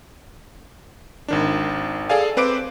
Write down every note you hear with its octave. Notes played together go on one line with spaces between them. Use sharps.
G#1 D#3 D4
G#4 A4 D5 F5 G#5
C4 B4 C5 D6 D7